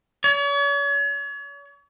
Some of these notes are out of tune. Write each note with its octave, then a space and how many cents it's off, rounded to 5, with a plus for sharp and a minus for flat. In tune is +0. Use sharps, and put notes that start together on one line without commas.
C#5 +40